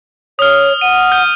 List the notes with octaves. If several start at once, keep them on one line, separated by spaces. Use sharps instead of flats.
C#5 D#6 F6
F#5 D#7
F6 G6